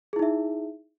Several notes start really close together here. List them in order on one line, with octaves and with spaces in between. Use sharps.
G#4 E4 D#4 E5